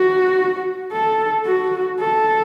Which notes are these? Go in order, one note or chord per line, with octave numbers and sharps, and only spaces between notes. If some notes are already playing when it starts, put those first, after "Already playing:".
Already playing: F#4
A4
F#4
A4